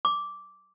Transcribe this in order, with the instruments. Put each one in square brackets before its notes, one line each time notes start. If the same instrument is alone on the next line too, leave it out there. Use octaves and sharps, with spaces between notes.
[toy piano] D6